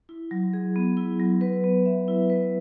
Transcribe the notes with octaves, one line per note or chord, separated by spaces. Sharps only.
E4
F#3
G#4
B3
E4
F#3
B4
B3
E5
E4
B4